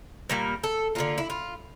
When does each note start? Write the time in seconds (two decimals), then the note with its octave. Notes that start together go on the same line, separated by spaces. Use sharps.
0.29 A#2 G3 A#3 A#4
0.63 A4
0.95 D3 G3 A#3 F4
1.18 E4
1.30 F4